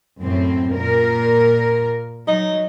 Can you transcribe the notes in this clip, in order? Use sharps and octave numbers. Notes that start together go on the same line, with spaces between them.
F#2 A2 C4
A#2 A#4
F#3 D#4